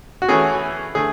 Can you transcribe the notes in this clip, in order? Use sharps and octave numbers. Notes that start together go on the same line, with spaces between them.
F#4
E3 A3 C#4 G#4
D3 A3 G#4